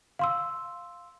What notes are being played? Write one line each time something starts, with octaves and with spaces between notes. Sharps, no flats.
F5 C6 E6